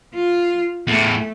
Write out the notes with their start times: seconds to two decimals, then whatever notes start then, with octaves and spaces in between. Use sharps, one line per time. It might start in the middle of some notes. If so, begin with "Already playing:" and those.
0.15 F4
0.87 E2 A2 A3